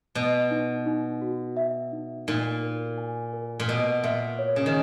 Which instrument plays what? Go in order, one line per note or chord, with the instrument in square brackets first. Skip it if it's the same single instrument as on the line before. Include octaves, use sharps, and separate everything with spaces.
[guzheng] B2 [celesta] B4
[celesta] D#4
D#4
F#4
E5
D#4
[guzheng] A#2 [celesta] D#4
[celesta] A#4
G#5
A#4
[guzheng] A#2
[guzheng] B2 [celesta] A#4
[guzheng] A#2 [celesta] E5
[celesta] C#5
[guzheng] C#3
D#3